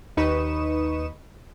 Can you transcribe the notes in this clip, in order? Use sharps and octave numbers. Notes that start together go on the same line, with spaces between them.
D#2 D#4 B4 C#6 D#6 E7